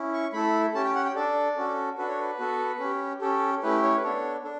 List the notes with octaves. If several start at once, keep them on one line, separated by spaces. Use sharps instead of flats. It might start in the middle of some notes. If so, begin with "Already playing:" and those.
Already playing: C#4 E4
C#6
A3 E4 A4 B5
C#4 G4 A5
G5
F#5
G5
D4 A4 D5
C#4 F#4 A4
D4 F#4 A4 B4
C#5
B4
B3 F#4 A4
C#4 G4
C#4 G4 A4
A3 C#4 E4 G4 B4
C#5
B4
B3 D4 A4 C#5
D4 A4